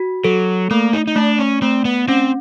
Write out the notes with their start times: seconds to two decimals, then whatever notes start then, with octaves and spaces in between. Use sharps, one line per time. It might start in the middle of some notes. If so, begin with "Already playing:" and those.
Already playing: F#4
0.24 F#3 A4
0.71 A3 A#3
0.93 D#4
1.07 D#4
1.16 A3 D4
1.39 C#4
1.62 A3 C4
1.85 B3
2.08 C4 C#4